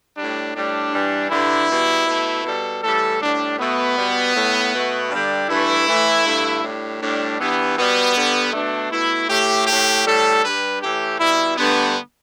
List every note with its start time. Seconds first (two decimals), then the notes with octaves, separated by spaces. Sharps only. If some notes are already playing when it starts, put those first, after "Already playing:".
0.16 A2 G3 D4
0.54 A2 G3 D4
0.92 G2 E3 G3
1.30 G2 D3 G3 E4
1.68 B2 G3
2.06 B2 A3
2.44 B2 G3 A4
2.82 A2 E3 G3 A4
3.20 A2 G3 D4
3.58 B2 A3 B3
3.97 B2 G3
4.34 A2 A3
4.72 B2 A3
5.10 G2 D3 G3 D4
5.48 G2 E3 A3 E4
5.86 A2 E3 A3
6.24 G2 D3 A3
6.62 A2 G3 D4
7.01 A2 G3 D4
7.39 G2 E3 G3 B3
7.77 B2 G3 B3
8.15 G2 D3 G3
8.53 B2 A3 D4
8.91 B2 A3 E4
9.29 A2 A3 G4
9.67 A2 A3 G4
10.05 A2 G3 A4
10.43 G2 G3 B4
10.81 A2 E3 A3 G4
11.19 B2 G3 E4
11.57 G2 D3 A3 B3